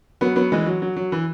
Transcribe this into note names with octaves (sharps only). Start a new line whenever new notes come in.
F#3 B3
F#3 B3
E3 G#3
F#3
F#3
F#3
E3